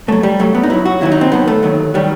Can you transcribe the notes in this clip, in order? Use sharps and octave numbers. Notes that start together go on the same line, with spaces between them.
F#2 F#3 A3
G3
F#2 F#3 A3
B3
D#4
F#2 F#3 E4
F#4
D#2 D#3 F#3 E4
D#4
C4
D#2 D#3 F#3 B3
A3
D#2 D#3 F#3
D#3 F#3 G3